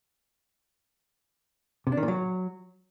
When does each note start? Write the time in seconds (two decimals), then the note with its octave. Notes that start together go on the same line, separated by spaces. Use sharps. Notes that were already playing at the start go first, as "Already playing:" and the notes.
1.87 C3
1.92 D4
1.97 D#3
2.03 A#2
2.08 F#3